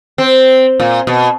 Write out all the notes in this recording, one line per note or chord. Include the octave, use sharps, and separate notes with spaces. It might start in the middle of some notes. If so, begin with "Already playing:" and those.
C4
A#2
B2